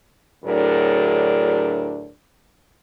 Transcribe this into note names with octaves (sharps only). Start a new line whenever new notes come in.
D2 A2 F#3 D4 G#4 A#4